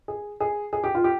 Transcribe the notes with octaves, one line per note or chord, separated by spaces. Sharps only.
G#4
G#4
G#4
G4
F4
G4